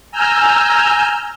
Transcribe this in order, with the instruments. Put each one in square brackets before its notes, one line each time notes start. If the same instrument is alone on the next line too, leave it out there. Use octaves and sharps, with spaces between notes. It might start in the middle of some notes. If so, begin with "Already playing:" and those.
[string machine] G#5 A#5 E6 F6 G6